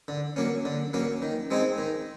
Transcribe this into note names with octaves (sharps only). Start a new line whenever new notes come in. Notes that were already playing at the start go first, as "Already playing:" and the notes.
D3
F#3 A#3 C#4
D3
F#3 A#3 C#4
D#3
G#3 C4 D#4 G#4
D#3